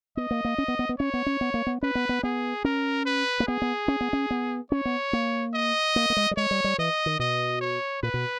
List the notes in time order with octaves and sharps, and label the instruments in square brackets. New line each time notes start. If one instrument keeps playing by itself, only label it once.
[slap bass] B3 [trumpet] D#5
[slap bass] A#3
A#3
C#4
B3
B3
B3
[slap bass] C#4 [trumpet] C#5
[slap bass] B3
C#4
B3
A#3
B3
[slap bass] C#4 [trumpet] B4
[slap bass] B3
B3
[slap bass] B3 [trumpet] G#4
[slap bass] C#4 [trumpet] A#4
[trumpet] B4
[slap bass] A#3
[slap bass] B3 [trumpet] G#4
[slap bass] B3
C#4
B3
C#4
B3
[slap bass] C#4 [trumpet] C#5
[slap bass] B3
A#3
[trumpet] D#5
[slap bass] A#3
A#3
G#3
G3
[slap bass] G#3 [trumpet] C#5
[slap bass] G3
G3
[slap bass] E3 [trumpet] D#5
[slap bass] D#3
[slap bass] B2 [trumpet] D#5
[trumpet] C#5
[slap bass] A#2 [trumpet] B4
[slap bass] B2